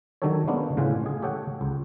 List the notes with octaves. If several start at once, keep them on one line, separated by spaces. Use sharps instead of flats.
D#3 F#3 D4 G4 A4 C#5
G#3 A#3 B3 C#4 D4
A2 C#3 F4 F#5 G#5
G#3 G#4
G4 A4 C#5 F#5 G5
C#2